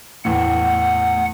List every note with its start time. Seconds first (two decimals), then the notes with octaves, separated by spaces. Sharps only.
0.25 E2 A2 F#5